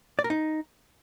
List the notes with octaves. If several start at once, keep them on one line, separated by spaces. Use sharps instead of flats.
D5
A#4
D#4